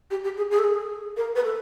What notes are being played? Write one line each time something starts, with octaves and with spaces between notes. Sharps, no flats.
G4
G4
G#4
G#4
A4
G#4
A#4
B4
A4